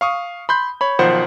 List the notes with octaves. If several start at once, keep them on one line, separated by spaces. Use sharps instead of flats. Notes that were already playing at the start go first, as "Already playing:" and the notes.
F5 C#6 D#6
B5 C6 G6
C#5 B5
B1 D#3 F3 C5 F#5